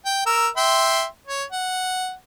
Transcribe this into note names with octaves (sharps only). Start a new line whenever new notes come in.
G5
A#4 E6
E5 G5 C6
C#5
F#5